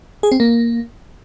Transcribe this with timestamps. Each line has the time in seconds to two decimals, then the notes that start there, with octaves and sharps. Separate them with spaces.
0.23 G#4
0.32 C4
0.40 A#3